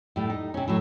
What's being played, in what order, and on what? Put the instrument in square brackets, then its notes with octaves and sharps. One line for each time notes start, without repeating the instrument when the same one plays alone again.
[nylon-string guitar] A2 G3
D#4
C3 C#4
A2 F#3